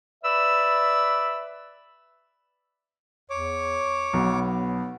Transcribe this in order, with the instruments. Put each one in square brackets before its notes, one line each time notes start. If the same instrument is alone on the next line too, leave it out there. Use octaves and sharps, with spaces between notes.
[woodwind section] B4 D5 E5 B5 E6
[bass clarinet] E2 [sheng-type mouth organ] C#5 D6
[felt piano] B1 [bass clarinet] B3